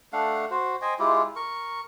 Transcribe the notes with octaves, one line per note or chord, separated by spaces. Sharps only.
A3 D4 F5 F#5
F#4 C5
C5 D#5 G5 G#5
G#3 E4 F4 G4
A#4 C#6